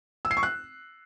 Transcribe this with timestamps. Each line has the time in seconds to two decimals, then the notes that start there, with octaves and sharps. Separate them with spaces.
0.25 E6
0.31 C7
0.37 C#6
0.43 F#6